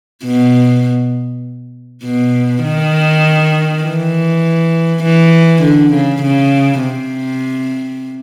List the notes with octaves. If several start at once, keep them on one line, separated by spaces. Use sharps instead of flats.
B2
B2
D#3
E3
E3
D3
C#3
C#3
C3